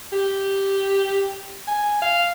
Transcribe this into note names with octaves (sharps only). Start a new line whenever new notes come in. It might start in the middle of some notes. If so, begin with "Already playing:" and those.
G4
G#5
F5